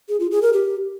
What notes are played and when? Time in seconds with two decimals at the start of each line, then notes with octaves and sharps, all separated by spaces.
0.09 G#4
0.20 F4
0.31 G#4
0.42 A#4
0.53 G4